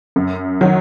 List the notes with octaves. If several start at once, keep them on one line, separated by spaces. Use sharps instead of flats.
F#2
D#3 F#3